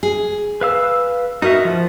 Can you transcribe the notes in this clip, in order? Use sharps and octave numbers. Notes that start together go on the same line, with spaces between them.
G#4
B4 F5 E6
D#4 F#4 A#4 E5
F3